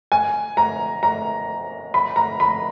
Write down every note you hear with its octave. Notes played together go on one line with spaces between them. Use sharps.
G#5
A#5
A#5
B5
A#5
B5